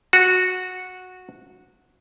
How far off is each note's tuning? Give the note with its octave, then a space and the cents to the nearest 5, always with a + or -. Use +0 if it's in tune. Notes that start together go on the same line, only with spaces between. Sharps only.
F#4 -10